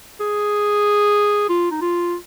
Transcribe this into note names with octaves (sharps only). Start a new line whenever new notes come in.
G#4
F4
D#4
F4